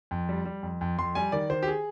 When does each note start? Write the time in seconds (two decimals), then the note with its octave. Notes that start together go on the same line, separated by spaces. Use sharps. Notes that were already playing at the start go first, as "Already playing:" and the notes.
0.11 F2
0.29 G3
0.45 G3
0.63 F2
0.81 F2
0.98 F2 C6
1.15 G3 G#5
1.32 D#3 D5
1.50 D#3 C5
1.63 G4
1.68 G#4